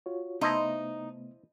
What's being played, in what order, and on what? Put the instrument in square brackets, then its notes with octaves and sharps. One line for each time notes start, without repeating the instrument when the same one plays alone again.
[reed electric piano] F4 F#4 C#5
[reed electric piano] C3 A3 B3 [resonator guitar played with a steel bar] D#4 [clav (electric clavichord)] E4 C5 D#5